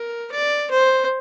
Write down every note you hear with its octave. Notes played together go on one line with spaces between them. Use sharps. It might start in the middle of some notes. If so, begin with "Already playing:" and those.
Already playing: A#4
D5
C5